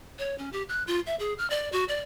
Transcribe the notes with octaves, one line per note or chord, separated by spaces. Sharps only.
C#5
C#4
G4
F#6
F4
E5
G#4
F6
D5
F#4
D5